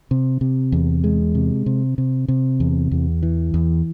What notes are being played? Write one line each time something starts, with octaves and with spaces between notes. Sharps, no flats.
C3
C3
E2
G#3
C3
C3
C3
C3
E2
E2
E3
E2